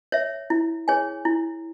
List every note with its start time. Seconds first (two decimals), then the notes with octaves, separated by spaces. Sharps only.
0.12 C#5 E5
0.50 E4
0.88 G#4 C#5 G#5
1.25 E4